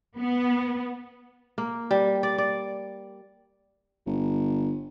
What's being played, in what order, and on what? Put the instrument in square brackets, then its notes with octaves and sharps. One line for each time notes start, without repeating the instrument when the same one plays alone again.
[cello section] B3
[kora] A#3
G3
D5
D5
[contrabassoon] G1